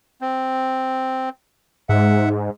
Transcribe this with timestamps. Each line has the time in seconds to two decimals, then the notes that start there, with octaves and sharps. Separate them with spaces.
0.21 C4
1.89 G#2 E5 F#5